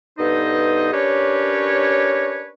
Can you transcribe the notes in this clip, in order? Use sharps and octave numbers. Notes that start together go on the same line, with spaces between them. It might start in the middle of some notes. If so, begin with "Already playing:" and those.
G2 B3 D#4 A4 C5 D#5
C#4 D4 G4 A#4 B4 C#5